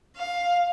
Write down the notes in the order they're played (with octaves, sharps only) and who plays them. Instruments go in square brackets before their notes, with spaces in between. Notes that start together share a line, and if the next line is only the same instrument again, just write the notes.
[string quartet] F5